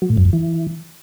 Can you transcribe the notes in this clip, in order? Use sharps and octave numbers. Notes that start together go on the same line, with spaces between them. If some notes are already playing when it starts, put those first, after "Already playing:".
F#3
A2
F#2
F2
E3